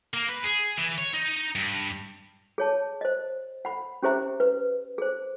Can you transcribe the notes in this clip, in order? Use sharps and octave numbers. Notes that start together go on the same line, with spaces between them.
A#3
B4
G#4
E3
C#5
D#4
G2
G#4 C#5 A5
C5 D#5
F#5 B5
C#4 G4 G#4 C5 E5 A#5
B4
G#4 C5